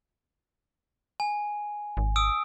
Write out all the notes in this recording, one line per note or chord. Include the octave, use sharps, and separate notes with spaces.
G#5
G#1
D#6 E6 D7